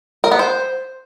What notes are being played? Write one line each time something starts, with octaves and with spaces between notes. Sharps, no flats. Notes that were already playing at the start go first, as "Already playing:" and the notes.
A#4
B3
C5